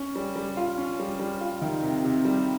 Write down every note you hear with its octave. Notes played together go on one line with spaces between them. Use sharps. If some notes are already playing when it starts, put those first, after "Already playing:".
Already playing: C#4
G3
G3
F4
C#4
G3
G3
F4
D#3
C3
C3
G3